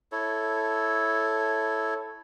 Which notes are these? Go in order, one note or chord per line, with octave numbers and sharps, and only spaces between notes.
E4 A4 C#5